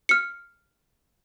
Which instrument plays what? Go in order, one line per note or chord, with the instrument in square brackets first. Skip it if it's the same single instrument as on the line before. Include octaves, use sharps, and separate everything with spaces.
[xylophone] F6 C#7